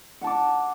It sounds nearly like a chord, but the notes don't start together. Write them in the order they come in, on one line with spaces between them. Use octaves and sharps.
F#5 A5 D6